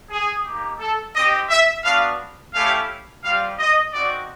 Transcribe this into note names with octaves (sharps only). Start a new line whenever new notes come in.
G#4
A#3 D#4 G4
A4
C4 D#4 G4 D#5
E5
B3 D4 F#4 F5
A3 C#4 E4 G4 F5
G3 C4 F4 F5
D#5
C4 D#4 F#4 D5